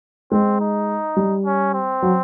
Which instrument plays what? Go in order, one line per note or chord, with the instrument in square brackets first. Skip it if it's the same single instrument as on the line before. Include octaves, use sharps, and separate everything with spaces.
[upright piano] G#3 [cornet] C4
[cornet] D#4
[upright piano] G3
[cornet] C#4
C4
[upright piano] F#3